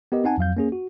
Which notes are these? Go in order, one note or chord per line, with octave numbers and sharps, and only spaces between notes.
B3 G4 A#4 D#5
C4 D#4 F#5 G#5 A5
F2 F#3 F5 G6
A#3 C#4 G#4
F#4